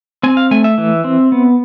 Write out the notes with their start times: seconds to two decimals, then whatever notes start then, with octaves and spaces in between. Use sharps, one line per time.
0.23 C4 G#5
0.37 F5
0.51 A3 G#5
0.64 E5
0.78 E3
1.04 C4
1.32 B3